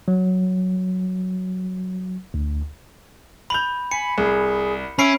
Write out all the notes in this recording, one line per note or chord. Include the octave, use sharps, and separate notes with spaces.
F#3
D2
B5 G6 F7 F#7
G#5 B5 C#7
C2 G#4
C#4 E5 B5 C7 D7